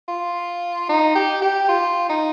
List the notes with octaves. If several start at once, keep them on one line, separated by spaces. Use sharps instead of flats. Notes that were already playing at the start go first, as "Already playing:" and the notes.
F4
D#4
G4
G4
F4
D#4